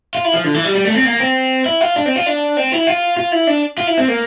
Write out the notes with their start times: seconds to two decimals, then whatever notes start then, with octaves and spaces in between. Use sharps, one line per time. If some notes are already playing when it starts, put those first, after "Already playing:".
0.15 F4
0.24 E4
0.34 F3
0.44 D3
0.54 E3
0.65 G3
0.75 G3
0.85 A3
0.95 C4
1.05 A#3
1.20 C4
1.66 E4
1.81 F4
1.96 D4
2.06 C4
2.16 F4
2.26 D4
2.57 C4
2.72 E4
2.87 F4
3.17 F4
3.32 E4
3.47 D4
3.78 F4
3.87 E4
3.98 C4
4.08 A#3